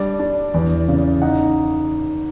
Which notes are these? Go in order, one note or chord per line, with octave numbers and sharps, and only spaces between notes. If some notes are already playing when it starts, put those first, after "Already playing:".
Already playing: G3 D4 D5
D4
E2
C#3
D#4 F#5